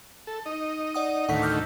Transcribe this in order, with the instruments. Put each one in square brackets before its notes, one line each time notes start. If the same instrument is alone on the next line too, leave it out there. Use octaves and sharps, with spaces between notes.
[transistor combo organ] A4
D#4 D#5
[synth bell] D5 F#5 D#6
[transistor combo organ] D2 A2 D#3 [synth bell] F#5 C#6 B6
[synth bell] D6 F6 G6